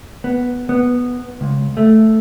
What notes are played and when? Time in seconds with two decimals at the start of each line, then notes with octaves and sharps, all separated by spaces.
0.24 B3
0.69 B3
1.41 C#2
1.77 A3